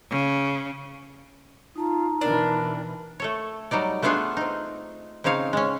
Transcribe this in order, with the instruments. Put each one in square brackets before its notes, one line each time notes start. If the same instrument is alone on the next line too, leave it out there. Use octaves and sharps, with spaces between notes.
[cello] C#3
[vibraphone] D#4 A5 A#5 [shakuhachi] F4
[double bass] B2 E3 [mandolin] D4 [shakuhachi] A#4
[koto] A3 A4 C#5
F#3 G3 D#4 D5
A3 B3 D4 F4 G#4 A4
C4 D#4
C#3 C4 D#4 C#5 F5
G#3 C#4